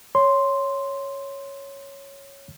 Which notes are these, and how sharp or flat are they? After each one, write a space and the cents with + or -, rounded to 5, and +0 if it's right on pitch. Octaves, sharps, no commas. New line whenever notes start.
C#5 +0 C6 +0